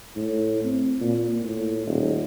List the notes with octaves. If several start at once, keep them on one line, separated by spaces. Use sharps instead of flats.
A2
C4
A#2
A2
D#1